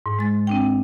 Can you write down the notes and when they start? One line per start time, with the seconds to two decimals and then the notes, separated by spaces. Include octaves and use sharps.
0.06 G#2
0.19 G#3 A6
0.47 C4 D4 G5